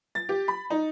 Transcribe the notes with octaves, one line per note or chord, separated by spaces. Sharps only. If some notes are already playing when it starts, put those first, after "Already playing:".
A6
G4
B5
D#4